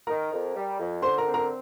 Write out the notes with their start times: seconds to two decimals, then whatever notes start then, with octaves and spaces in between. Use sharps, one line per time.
0.07 D#3 A#4 A#5
0.31 F2
0.55 G3
0.79 F2
1.02 D3 C5 C6
1.18 A#4 A#5
1.26 C4
1.34 A#4 A#5